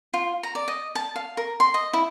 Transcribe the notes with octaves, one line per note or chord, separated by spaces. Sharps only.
F4
A#5
D5
D#5
A5
F5
A#4
C6
D#5
E4